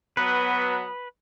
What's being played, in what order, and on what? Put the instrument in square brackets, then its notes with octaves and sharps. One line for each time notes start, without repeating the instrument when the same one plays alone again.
[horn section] F#3 B3 [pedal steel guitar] B4